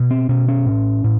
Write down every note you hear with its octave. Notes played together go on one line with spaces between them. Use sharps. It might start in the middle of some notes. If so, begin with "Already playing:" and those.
Already playing: B2
C4
B2 C#4
C#4
A2
A2